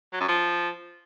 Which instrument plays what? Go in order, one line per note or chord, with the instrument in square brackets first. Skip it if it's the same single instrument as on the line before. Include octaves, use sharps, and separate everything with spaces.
[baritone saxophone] F#3
F#2
F3